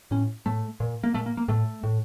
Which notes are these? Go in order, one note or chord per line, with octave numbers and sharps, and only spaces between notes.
A2 C#4
A2 A3
A#2
A#3
A#2 A3
A#3
A#3
A2 A3
A2